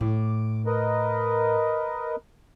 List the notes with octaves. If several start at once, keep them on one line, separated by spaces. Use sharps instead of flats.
A2 D6
A#4 B4 D#5